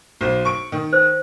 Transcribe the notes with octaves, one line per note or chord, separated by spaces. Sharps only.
B1 C5
C#6 D7
D#3
C5